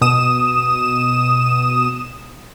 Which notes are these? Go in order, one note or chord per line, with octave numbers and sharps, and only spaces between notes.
B2 D#6 E7